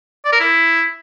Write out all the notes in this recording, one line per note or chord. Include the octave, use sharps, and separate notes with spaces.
D5
A#4
E4